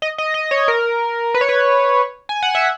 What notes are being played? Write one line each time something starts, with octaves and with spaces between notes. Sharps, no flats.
D#5
D#5
D#5
C#5
A#4
B4
C#5
B4
G#5
F#5
E5